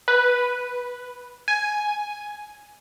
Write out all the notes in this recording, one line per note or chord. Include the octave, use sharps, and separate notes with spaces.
B4
G#5